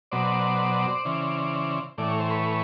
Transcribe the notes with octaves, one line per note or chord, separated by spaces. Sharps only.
B2 F#3 C5 D5
C#3 E3
A2 E3 D5
C#5
C5
B4 C#5